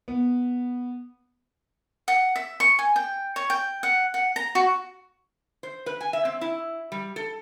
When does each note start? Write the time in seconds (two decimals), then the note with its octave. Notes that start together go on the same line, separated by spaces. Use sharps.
0.08 B3
2.08 F#5
2.36 E5
2.60 C#6
2.79 G#5
2.96 G5
3.36 C#5
3.50 G5
3.83 F#5
4.14 F#5
4.36 A#5
4.55 F#4
5.63 C5
5.86 B4
6.01 G#5
6.13 E5
6.25 C4
6.41 E4
6.92 G3
7.16 A4